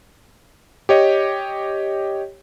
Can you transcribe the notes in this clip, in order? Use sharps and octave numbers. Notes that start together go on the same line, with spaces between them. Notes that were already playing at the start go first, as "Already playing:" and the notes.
G4 C#5 D#5